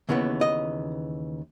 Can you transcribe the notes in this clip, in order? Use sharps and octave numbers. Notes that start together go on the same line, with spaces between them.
D#2 C#3 E3 B3
D#5